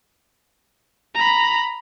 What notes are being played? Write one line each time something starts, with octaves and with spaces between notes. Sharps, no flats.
A#5 B5